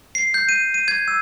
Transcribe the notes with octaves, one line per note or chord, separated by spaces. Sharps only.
C7
G6
D#7
D#7
G#6
E6